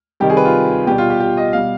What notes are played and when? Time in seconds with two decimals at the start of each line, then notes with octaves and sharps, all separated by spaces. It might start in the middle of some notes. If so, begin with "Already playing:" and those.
0.20 C3 D#3 G3 G4
0.30 G#4
0.37 B4
0.45 F4
0.87 B2 G3 G4
0.98 F4
1.10 G4
1.20 G4
1.37 D#5
1.53 B2 G3 F5